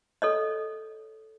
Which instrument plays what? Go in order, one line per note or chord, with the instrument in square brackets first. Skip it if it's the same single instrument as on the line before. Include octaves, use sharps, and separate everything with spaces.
[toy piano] A4 C#5 D#5